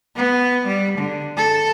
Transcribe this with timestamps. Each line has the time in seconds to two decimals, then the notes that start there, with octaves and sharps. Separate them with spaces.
0.16 B3
0.66 G3
0.98 D3
1.37 A4